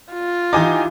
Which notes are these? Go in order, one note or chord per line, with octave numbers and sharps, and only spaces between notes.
F4
E3 D#4 G4 G#5 D6